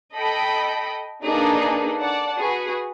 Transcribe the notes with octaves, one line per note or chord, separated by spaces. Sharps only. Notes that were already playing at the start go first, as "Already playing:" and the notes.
A4 D#5 G5 B5
A#3 D4 D#4 G#4 A4 B4
D5 F#5 A5
F#4 G#4 B4